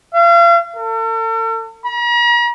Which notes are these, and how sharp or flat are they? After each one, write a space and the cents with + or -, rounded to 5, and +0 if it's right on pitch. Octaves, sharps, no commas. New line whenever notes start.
F5 -40
A4 +45
A#5 +45